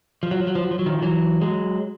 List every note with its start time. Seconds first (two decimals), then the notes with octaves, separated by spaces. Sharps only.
0.23 F3
0.31 F#3
0.40 F3
0.47 F#3
0.55 F3
0.62 F#3
0.71 F3
0.79 F#3
0.86 D#3 F3
1.02 E3 F#3
1.42 F#3 G#3